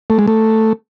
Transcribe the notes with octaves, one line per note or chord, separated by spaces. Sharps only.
A3
G#3
A3